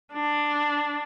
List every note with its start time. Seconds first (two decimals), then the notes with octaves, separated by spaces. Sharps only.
0.12 D4